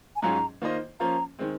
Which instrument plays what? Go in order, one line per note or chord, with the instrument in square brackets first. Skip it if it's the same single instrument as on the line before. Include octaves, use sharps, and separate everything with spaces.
[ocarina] G#5
[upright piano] G#2 F#3 C#4 F4 G#4 [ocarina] A#5
[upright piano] D#3 A#3 F4 C5 D#5
[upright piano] F3 A#3 C#4 F4 [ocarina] A#5
[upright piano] D#3 G#3 C4